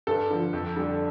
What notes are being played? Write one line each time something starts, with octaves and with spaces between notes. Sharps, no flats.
G2 A4
D3 F3
F2
D3 G3